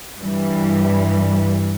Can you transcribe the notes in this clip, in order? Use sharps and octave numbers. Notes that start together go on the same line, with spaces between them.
G2 E3 G3